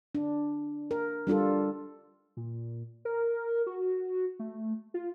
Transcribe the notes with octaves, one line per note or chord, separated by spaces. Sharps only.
D4
A#4
G3 D4 F4 A4
A#2
A#4
F#4
A3
F4